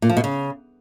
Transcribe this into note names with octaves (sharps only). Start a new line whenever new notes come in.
A#2
F3
B2
C#3